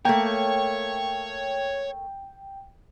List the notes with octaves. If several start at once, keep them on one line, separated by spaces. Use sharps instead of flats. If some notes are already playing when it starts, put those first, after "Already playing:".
A3 A#3 C#5 G5